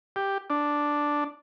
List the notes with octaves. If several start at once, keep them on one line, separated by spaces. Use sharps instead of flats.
G4
D4